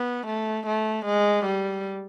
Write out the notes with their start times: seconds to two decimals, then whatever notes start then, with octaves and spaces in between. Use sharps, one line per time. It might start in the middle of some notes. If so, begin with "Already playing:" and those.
Already playing: B3
0.27 A3
0.67 A3
1.05 G#3
1.45 G3